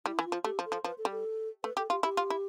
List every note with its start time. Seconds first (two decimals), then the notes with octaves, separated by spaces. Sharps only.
0.06 G3 E4
0.19 E3
0.25 F4
0.32 F3
0.44 A3 G4
0.59 F3
0.65 A4
0.72 F3
0.84 F3 B4
0.98 A4
1.05 G3
1.11 A4
1.64 A3 B4
1.77 G4 A4
1.90 F4 G4
2.03 E4 G4
2.17 F4
2.30 E4